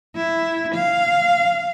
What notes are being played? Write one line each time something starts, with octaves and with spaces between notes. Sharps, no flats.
E4
F5